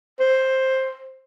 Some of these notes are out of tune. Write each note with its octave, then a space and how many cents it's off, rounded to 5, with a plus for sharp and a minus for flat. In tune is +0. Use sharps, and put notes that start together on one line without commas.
C5 +10